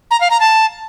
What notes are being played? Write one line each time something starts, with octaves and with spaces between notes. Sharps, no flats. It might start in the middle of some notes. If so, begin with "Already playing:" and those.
A#5
F5
A#5
A5